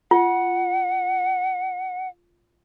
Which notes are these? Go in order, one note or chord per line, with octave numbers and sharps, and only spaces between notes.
F4 F#5